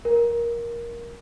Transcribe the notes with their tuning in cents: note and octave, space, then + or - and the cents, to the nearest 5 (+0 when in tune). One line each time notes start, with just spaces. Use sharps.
A#4 +15